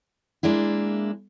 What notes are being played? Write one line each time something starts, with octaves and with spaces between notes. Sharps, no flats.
G#3 A#3 D4 E4